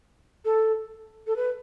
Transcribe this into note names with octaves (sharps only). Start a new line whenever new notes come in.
A4
A4
B4